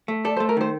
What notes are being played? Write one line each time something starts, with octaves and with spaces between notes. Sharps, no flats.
A3
A4 D5
C5
A3
A#4
D#3 C5